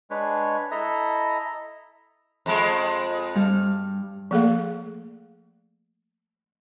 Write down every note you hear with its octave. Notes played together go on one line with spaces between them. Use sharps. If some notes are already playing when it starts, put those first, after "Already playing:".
G#3 D4 B4 C#5
E4 A4 D#5 E5 A#5
F2 G#3
G2 G3 F6
F3 A3 A#3 G#4 A4 F5